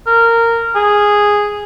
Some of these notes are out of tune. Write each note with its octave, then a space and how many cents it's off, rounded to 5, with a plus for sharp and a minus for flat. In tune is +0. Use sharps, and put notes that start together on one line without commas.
A#4 -15
G#4 -5